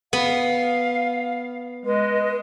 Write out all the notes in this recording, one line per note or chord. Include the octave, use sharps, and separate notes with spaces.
B3 F5
G#3 B4 D#5